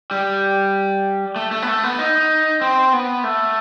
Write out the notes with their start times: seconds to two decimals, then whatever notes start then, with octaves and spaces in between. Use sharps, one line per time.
0.11 G3
1.36 A3
1.51 A3
1.62 B3
1.68 A3
1.83 B3
1.99 D#4
2.61 C4
2.93 B3
3.24 A3